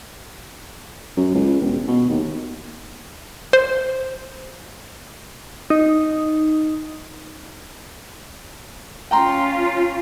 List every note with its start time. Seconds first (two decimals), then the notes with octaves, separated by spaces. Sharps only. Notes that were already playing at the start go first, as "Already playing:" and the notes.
1.17 F#2
1.35 C#2
1.61 E1
1.88 B2
2.09 D#2
3.53 C5
5.70 D#4
9.11 C#4 F4 G5 A#5 C6